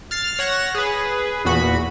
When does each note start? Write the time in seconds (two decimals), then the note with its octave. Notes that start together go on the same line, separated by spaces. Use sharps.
0.11 F6 A6 C7
0.39 C#5 F#5 A#6 E7
0.75 G#4 B4
1.45 E2 A#2 F#4 B5